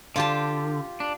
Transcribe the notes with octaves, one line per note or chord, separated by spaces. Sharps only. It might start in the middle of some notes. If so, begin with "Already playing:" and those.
D3 F4 G4 A5
D4